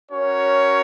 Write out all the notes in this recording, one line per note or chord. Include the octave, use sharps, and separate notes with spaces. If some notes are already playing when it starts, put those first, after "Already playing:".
C#4 F#4 A#4 C#5